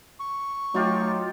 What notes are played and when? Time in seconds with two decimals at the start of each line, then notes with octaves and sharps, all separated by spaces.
0.20 C#6
0.74 F#3 A3 D#4 F4 G4